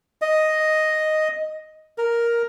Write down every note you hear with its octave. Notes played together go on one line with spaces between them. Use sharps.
D#5
A#4